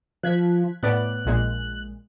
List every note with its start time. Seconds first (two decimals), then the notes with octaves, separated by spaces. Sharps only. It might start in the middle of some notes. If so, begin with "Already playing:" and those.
0.23 F3 F#6 G#6 B6
0.83 A2 B3 D5 F#6
1.25 A#1 A#2 G#3